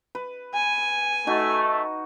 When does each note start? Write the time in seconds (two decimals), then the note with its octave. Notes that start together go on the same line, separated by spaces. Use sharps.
0.15 B4
0.54 G#5
1.27 A3 D#4 F#4